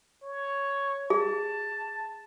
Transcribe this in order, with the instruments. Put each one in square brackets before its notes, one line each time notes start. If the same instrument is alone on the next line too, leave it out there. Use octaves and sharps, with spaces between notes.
[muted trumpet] C#5
[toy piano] G#4 [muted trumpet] A5